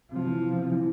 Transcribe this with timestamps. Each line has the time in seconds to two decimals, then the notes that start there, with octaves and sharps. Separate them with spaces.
0.11 C3 F3
0.26 E3
0.41 C3
0.56 C3
0.72 E3